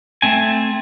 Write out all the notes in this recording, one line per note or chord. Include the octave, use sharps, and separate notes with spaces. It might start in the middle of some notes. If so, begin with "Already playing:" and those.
A3 C4 G#5